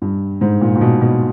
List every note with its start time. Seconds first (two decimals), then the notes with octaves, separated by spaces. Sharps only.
0.02 G2
0.41 G#2
0.61 A#2
0.75 A#2
0.81 B2
1.01 B2